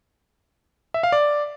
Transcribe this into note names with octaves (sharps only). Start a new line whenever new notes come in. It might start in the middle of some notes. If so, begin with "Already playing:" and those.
E5
F5
D5